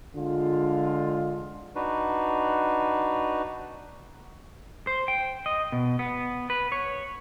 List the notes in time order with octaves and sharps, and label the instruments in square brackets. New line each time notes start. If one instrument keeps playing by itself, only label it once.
[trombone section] D3 G#3 F4
[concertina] D4 D#4 F#4 B4
[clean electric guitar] C5
G5
D#5
B2
B3
B4
C#5